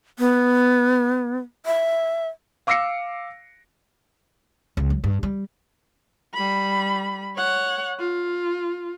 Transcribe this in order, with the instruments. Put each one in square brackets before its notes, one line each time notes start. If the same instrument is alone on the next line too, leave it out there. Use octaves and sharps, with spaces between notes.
[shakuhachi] B3
E5
[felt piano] F5 D6 E6 A#6 C7 C#7
[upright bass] C#2
F#3
G2
G3
[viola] G3 B5
C#5 F#5
F4